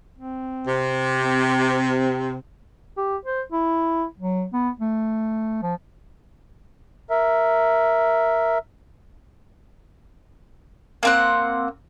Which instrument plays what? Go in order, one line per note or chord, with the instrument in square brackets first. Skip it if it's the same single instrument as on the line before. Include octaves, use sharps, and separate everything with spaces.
[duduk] C4
[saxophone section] C3
[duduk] C4
[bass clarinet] G4
C5
E4
F#3
B3
A3
F3
[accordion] A#4 E5
[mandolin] A#3 C4 F#5